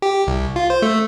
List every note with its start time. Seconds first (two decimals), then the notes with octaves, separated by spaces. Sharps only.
0.02 G4
0.27 C2
0.56 F4
0.70 C5
0.82 A3